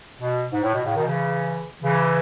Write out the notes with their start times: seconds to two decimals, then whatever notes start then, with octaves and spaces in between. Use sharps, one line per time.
0.21 B2
0.53 G#2
0.64 A2
0.74 B2
0.85 A2 C#3
0.96 B2 D#3
1.07 C#3 E3
1.82 C#3 E3